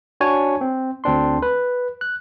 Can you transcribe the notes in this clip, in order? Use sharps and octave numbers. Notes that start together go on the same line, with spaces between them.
D4 F#4 C#5 G#5
C4
D2 C4 D4 C6
B4
F#6